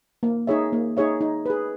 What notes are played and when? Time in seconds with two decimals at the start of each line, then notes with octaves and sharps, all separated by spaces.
0.23 A#3
0.47 D#4 G#4 C#5 E5
0.73 A#3
0.97 D#4 G#4 C#5 E5
1.21 D#4
1.46 G#4 B4